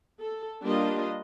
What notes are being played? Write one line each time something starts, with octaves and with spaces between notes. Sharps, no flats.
A4
G3 A#3 D4 F4 D#5